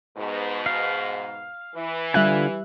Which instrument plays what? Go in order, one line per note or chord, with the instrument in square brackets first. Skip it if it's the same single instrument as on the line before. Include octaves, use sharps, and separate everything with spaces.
[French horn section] G#2 B2
[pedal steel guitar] F5
[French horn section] E3
[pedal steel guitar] D3 F4 G#5 [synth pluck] G3 E5 F#6